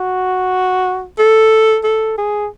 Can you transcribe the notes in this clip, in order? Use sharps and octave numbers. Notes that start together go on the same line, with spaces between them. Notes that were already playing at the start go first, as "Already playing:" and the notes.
Already playing: F#4
A4
A4
G#4